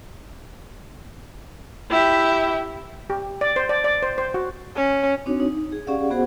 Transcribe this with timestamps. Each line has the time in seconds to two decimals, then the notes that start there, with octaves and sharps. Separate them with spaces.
1.90 E4 G4 E5
3.10 G4
3.41 D5
3.56 C5
3.69 D5
3.84 D5
4.03 C5
4.18 C5
4.34 F#4
4.76 C#4
5.26 C4 D4 D#4 F#4 C#5
5.40 D#4
5.72 G#4
5.87 C#4 G4 G#4 D5 F5 F#5
6.10 B3 F#4 G#4 C5 F#5